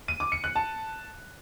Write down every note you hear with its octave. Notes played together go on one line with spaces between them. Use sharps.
D#7
D6
C#7
F#6
A5